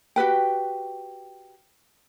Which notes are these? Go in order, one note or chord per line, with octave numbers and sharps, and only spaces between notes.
F#4 G4 B4 G5